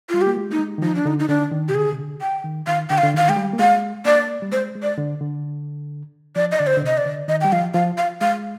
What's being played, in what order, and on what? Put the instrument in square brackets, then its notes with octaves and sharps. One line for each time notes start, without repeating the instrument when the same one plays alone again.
[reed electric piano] G3 [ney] F4
[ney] G4
[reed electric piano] A#3
G#3
[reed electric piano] A#3 [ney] D#4
[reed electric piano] G#3
D#3
[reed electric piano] F3 [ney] D#4
[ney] D4
[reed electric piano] D3 [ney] D#4
[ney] D#4
[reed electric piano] D3 [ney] D4
[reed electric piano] D#3
[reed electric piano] C3 [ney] G4
[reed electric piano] D3 [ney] G#4
[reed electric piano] C3
D3
[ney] G5
[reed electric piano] D#3
[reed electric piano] D#3 [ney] F5
[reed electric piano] D3 [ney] G5
[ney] F5
[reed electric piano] D3
[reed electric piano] D#3 [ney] F5
[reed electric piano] G#3 [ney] G5
[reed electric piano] G3
A#3
[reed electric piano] G#3 [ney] F5
[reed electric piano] A#3 [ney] D5
[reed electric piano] G3
[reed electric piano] G#3 [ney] C5
[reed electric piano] G#3
[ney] D5
[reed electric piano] D3
D3
[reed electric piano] F3 [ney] D5
[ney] D#5
[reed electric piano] D3 [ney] D5
[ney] C5
[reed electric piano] D3
[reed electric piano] C3 [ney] D#5
[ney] D5
[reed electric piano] D3
[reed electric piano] D#3 [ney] D#5
[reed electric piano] G3 [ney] G5
[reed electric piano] F3 [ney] F5
[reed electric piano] F3 [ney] F5
[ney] F5
[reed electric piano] G#3 [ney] F5